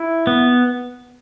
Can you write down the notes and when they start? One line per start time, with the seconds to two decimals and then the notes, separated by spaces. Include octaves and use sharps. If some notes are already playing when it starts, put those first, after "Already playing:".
Already playing: E4
0.27 B3